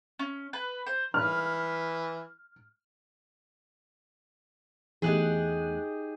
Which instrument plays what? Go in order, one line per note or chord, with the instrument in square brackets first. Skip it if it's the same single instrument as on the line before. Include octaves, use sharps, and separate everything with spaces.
[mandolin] C#4
B4
C5
[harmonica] E3 B4 [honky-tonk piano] F6
[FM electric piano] E2 A3 F#6 [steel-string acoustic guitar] D#4 G4 G#4